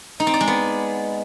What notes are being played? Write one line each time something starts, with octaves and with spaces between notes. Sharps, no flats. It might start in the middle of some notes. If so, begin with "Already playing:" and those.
D#4
C4
D5
G#3
B3